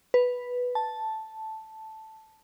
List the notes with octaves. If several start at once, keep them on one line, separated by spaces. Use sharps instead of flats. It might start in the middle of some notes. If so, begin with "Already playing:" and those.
B4
A5